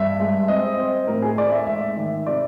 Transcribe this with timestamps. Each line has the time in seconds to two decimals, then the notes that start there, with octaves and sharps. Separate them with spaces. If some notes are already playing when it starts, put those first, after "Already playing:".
Already playing: G2 E5
0.20 G#3
0.48 C4 D#5
0.78 C4
1.07 A2 A#4
1.22 G#4
1.38 A3 D5
1.52 E5
1.67 G#2 E5
1.97 D#3
2.27 C3 D5